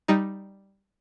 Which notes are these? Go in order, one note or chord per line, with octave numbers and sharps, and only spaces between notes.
G3 D#4